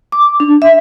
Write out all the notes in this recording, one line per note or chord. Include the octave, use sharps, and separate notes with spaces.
D6
D4
E5